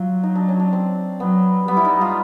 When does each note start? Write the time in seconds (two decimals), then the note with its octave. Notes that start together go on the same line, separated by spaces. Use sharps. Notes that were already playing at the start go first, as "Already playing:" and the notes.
Already playing: F#3 F4
0.23 D#4
0.35 D4
0.48 C#4
0.60 D4
0.73 C4
1.20 F#3 B3
1.68 G3 B3
1.77 E4
1.85 D#4
2.01 F4